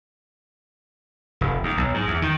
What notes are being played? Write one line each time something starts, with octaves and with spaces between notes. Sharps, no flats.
F1
D#2
B1
G#2
E2
D#3